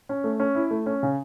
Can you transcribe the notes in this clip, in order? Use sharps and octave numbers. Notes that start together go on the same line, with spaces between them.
C#4
A3
C#4
E4
A3
C#4
C#3